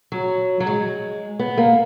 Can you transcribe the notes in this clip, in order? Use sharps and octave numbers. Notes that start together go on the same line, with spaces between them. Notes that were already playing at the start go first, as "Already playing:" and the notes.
F#3
F#3
G#3
B3
A#3